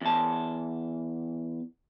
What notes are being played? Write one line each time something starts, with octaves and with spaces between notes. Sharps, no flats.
E2 A5